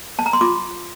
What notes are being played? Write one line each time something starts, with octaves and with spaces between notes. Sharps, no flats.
A5
A#5
C6
F4 D6